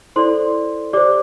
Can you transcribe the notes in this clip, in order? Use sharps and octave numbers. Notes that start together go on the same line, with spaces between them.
E4 A4 C5 D5 C6
G4 C5 D5 D6